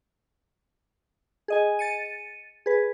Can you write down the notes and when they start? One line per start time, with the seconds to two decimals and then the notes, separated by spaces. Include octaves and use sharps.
1.48 G#4 D#5 G#5
1.79 A6 C#7 D#7
2.66 G#4 B4